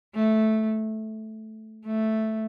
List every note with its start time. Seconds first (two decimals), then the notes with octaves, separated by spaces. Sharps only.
0.15 A3
1.86 A3